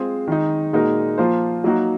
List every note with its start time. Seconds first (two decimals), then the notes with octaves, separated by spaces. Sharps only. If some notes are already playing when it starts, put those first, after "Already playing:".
Already playing: G#3 C4 F4 G#4 C5
0.28 D#3 G#3 D#4
0.73 A#2 G#3 D#4 F#4 A#4
1.18 F3 A#3 F4 C5
1.64 F#3 A#3 D#4 F#4